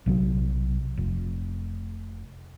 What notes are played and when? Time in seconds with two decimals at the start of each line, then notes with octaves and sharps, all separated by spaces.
0.06 B1 C3 F3 F#3
0.97 F1